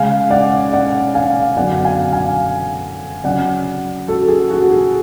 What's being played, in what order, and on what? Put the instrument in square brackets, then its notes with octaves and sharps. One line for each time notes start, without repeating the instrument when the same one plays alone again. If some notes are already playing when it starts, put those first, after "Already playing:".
Already playing: [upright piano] C#3 G#3 C#4 F5 G#5
D5 F#5
D5 F#5
F5 G#5
F#2 D3 F#3 B3 D5 F#5
F5 G#5
F5 G#5
C#3 F#3 C#4 D5 F#5
F#4 A4
G#4
F#4
G#4